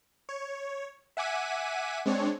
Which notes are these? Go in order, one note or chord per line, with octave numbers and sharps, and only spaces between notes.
C#5
E5 F#5 G#5 D6 B6 D#7
G#3 C4 D4 C#5